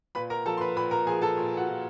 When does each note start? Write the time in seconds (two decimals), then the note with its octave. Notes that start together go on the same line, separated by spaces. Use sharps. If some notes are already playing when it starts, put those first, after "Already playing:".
0.15 A#2 B4 B5
0.30 A#4 A#5
0.45 F3 A4 A5
0.57 C6
0.61 B4 B5
0.76 A#2 B4 B5
0.91 A#4 A#5
1.06 F3 G#4 G#5
1.22 A4 A5
1.37 A#2
1.57 F#4 F#5
1.68 F3